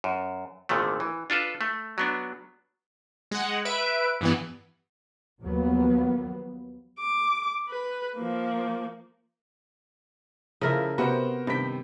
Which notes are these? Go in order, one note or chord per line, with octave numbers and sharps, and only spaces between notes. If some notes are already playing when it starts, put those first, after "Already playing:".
F#2
G#1 A#2 D3 D#3 A3
E3
D4 F4 A4 B4
A3
F#3 B3 D4
G#3 F#5
B4 E5 D7
G2 E3 B3
D#2 F3 F#3 A#3 B3
D6
B4
F3 A#3
C#3 F3 A3 E4 A#4 E5
C3 B3 F#4 A#4 C5
G2 C3 D#3 G5 B6